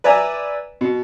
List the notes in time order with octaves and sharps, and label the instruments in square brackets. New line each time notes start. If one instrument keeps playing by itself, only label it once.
[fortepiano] B4 D5 E5 G#5 A#5
B2